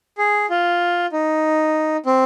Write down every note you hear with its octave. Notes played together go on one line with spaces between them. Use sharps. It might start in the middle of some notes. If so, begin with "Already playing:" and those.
G#4
F4
D#4
C4